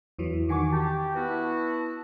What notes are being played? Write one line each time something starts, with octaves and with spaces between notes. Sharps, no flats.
E2 E3 F#3
D#3 F#4 G#5 C#6 D6
G4 A5
B3 E4 F#4